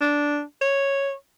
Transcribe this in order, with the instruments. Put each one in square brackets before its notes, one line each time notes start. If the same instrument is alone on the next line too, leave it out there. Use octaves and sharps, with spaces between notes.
[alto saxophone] D4
C#5